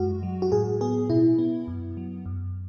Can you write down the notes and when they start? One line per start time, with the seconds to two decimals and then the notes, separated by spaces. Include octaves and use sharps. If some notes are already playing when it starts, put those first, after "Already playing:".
Already playing: F#2 G#3 F#4
0.23 F#3
0.42 F#4
0.52 A2 G#4
0.81 B3 G#4
1.10 B2 E4
1.38 B3
1.68 F#2
1.97 F#3
2.26 F#2